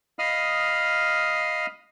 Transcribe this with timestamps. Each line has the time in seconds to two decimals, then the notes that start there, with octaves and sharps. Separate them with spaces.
0.19 D#5 F5 B5 D#6 F6